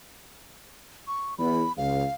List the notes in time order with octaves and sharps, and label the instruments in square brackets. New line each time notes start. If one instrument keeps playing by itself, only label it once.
[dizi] C#6
[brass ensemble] E2 [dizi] B5
[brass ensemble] C#2 [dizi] F5